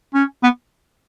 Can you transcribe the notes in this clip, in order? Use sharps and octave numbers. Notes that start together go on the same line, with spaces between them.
C#4
B3